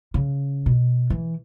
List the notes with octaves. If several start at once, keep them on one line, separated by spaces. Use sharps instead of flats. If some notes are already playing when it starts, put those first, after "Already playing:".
C#3
B2
E3